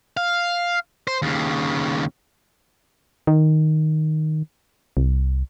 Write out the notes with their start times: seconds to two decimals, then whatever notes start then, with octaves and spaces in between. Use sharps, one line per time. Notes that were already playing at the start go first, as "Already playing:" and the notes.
0.17 F5
1.08 C5
1.22 D#2 C#3
3.27 D#3
4.97 C2